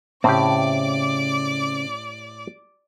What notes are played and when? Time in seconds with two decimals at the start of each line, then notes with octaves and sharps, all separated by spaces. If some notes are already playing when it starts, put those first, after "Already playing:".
0.24 A2 C#3 C4 G4 D5 D6